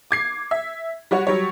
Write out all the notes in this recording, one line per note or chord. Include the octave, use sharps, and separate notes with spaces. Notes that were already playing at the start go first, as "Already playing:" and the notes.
D6 G#6 C7
E5
G3 F#4 C#5
F#3 G3 C#5